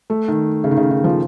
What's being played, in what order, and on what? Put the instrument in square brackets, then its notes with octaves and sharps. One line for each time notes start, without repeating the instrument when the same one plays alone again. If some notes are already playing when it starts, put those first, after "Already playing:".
[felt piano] A3
D#3
C#3
D#3
C#3
D#3
F3